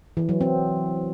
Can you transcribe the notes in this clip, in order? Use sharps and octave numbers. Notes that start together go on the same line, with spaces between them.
E3
F#3
C4